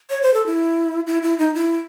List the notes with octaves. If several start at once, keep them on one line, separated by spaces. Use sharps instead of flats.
C#5
C5
A4
E4
E4
E4
D#4
E4